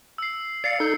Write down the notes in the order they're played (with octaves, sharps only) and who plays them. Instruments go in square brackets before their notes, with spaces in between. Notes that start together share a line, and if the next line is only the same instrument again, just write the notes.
[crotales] E6 C7
[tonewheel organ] D5 F5 [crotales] C7 C#7
[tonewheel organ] D#4 A4 G6